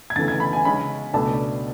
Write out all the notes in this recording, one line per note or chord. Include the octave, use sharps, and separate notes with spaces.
G#6
D2 C#3 E3 A3 A6
G#6
B5
G#5
C#3 G#3 C#4 B5
C#2 B2 A3 D4 A5